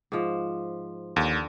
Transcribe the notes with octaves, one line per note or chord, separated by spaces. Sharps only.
G#2 F3
D#2 D3